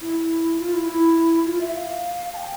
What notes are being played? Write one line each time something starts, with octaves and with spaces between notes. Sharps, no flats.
E4
F4
E4
E4
F4
E5
F5
A5
G5